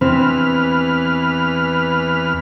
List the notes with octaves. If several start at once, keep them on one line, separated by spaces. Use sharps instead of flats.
E2 C4 B4 F6